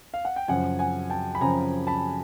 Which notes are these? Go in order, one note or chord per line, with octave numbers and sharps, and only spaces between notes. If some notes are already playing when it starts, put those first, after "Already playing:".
F5
F#5
G5
F#2 C#3 F3 F#5 G#5
F#5 G#5
G5 A5
B5
F#2 C#3 F3 G#5 A#5
A5 B5